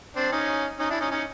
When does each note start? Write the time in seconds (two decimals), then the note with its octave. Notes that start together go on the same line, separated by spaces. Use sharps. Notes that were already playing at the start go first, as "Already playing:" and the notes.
0.16 C4 D4
0.32 C#4 D#4
0.79 C#4 D#4
0.90 D4 E4
1.01 C#4 D#4
1.11 C#4 D#4